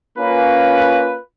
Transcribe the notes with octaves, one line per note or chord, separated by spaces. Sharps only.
A#3 C#4 F4 B4